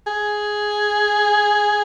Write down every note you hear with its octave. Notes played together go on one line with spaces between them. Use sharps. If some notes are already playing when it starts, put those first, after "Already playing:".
G#4